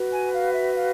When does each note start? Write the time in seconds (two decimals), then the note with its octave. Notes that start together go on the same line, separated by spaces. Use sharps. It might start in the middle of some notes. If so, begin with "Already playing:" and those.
Already playing: F#4 B4
0.13 G#5
0.34 F5
0.54 E5
0.75 F5